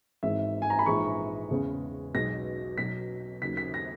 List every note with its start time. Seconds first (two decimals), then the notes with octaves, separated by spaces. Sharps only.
0.23 G#1 G#2 E3 G#3 E5
0.62 G#5
0.70 A#5
0.79 B5
0.86 A#1 G#2 E3 G#3 C#6
1.51 E2 C#3 G#3
2.14 B1 B2 G#3 A#6
2.78 B1 B2 F#3 B6
3.42 D#2 C#3 F#3 B6
3.57 B6
3.74 A#6